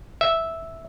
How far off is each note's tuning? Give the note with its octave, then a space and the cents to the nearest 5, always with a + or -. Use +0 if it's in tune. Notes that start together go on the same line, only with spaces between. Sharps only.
E5 -5